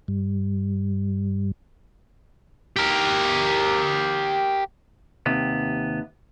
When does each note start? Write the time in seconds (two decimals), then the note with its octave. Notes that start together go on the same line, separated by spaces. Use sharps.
0.08 G2 G3
2.76 G4 A#4
5.26 D#2 C3 B3